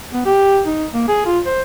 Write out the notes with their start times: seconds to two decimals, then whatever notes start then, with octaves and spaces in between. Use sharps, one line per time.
0.13 B3
0.26 G4
0.66 D#4
0.94 A#3
1.08 G#4
1.26 F4
1.46 C5